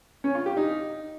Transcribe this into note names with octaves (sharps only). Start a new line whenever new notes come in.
C#4
F4
G4
D#4